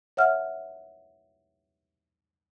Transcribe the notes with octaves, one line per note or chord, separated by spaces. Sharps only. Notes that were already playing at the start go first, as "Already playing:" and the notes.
C#5 E5 F#5 F6